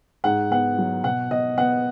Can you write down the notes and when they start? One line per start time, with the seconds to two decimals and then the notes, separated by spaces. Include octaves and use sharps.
0.24 G#2 F#5
0.51 B3 F#5
0.78 F#3
1.04 B2 F#5
1.31 B2 D#5
1.58 B3 F#5